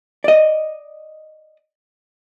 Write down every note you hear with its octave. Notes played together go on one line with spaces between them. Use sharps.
D5 D#5